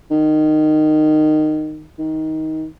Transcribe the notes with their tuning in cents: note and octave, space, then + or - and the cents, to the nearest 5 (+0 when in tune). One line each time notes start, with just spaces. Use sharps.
D#3 -15
D#3 +20